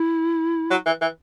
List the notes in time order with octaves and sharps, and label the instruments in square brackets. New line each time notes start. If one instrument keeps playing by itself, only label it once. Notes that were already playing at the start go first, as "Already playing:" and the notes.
Already playing: [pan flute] E4
[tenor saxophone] F#3
E3
E3